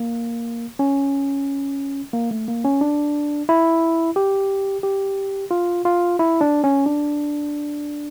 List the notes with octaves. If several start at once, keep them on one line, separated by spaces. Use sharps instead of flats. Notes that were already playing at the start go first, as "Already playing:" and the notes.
Already playing: A#3
C#4
A#3
A3
A#3
C#4
D4
E4
G4
G4
F4
F4
E4
D4
C#4
D4